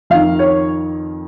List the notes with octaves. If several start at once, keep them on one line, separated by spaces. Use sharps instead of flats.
F2 D#3 F5
C#5